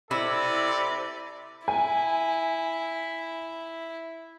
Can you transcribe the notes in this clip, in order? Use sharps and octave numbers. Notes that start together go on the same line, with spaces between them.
C3 E4 A4 D5
E4 G#5